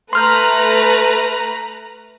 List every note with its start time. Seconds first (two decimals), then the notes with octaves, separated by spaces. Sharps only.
0.13 A3 B4 A#5 C6 F6 G6